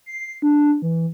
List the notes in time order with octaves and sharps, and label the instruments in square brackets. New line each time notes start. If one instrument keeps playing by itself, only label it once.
[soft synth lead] C7
D4
E3